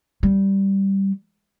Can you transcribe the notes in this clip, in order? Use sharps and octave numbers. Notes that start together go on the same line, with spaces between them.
G3